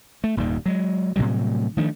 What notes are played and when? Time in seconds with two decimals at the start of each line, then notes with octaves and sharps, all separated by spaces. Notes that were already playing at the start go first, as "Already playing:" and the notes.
0.24 A3
0.37 D#1 D#2 G#2 G3
0.66 F#3 G#3
1.16 A2 C3 F#3 G3
1.77 D#3 F3 A3 D4